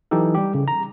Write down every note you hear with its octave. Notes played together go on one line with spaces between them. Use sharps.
E3 F#3 D#4 G4 A4
G3 G4
C#3
A#5